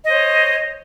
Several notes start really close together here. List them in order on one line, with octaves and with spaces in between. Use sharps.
D#5 C5 C#5